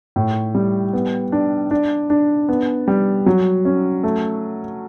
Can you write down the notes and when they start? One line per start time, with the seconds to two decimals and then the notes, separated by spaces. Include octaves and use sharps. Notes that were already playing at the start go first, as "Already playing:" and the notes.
0.16 A2
0.55 G3
0.93 B3
1.32 D4
1.71 D4
2.10 D4
2.49 B3
2.88 G3
3.26 F#3
3.65 C#4
4.03 A3